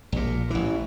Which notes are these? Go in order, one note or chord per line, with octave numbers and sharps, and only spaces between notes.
A#1 A#2
A1 E3